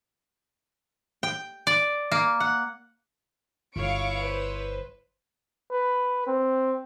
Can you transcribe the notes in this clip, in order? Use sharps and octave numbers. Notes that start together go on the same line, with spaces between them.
G5
D5
A#3
F#5
G1 E4 C#5 F5 C#6 D7
B4 C5
B4
C4